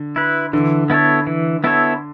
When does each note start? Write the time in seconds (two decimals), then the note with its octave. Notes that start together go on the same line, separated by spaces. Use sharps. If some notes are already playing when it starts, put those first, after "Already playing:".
Already playing: D3
0.16 E4 B4
0.53 D3 E3
0.90 B3 E4 A4 C#5
1.27 E3
1.64 B3 E4 A4 C#5